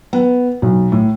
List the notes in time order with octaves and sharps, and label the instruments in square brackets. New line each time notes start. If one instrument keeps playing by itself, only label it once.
[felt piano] B3
B1
A2